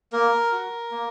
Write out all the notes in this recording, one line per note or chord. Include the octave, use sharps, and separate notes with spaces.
A#3 A#4
F#4
A#3